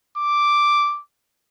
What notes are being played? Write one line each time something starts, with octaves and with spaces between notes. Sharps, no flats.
D6